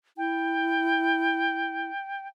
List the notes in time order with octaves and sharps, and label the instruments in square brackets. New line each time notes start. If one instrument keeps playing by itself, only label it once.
[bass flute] E4 [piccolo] G5